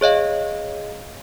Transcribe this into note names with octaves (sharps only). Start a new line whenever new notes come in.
G#4 C#5 D#5 F5